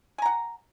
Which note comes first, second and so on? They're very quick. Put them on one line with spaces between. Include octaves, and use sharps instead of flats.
G#5 A#5 F#5